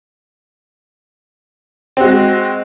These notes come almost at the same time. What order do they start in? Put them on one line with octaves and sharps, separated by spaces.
C4 F#4 G#3